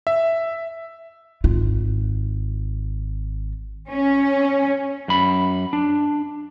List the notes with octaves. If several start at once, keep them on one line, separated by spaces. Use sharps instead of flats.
E5
G#1 F4
C#4
F#2 B5
D4